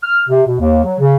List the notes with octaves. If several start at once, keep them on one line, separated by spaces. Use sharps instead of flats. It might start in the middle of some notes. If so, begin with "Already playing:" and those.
F6
C3
B2
D#2
F#3
C#3